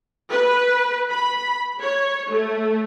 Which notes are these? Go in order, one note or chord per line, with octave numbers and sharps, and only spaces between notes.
B4
B5
C#5
A3